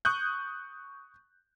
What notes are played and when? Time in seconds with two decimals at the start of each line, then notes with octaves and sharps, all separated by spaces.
0.05 C#6 D#6 F#6 G6